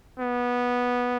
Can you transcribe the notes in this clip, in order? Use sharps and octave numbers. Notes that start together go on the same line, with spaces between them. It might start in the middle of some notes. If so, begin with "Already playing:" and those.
B3